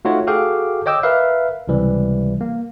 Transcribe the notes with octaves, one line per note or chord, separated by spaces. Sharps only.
A3 D#4 F4 F#4 C#5
F#4 G#4 A4 F5 G5 D6
C#5 D#5 G5 D6 E6
A#4 B4 E5 F5
C#2 C3 E3 G3
A#3